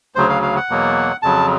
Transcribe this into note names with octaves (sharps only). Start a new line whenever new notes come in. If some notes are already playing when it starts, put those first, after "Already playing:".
D2 C#3 F#3 C5
F5
F5
F#5
E2 B2 F#3 A#3
F2 C#3 F#3 A5